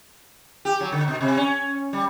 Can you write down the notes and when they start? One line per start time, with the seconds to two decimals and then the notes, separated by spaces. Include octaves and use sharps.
0.65 G4
0.81 F#3
0.92 D3
1.08 B2
1.21 C3
1.37 C#4
1.93 G3